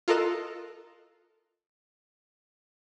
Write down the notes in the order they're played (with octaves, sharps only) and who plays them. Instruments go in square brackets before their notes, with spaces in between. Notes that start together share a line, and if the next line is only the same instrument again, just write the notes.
[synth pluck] F4 A4 A#4 D#5 F#6 E7